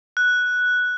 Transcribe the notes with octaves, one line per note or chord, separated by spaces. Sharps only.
F#6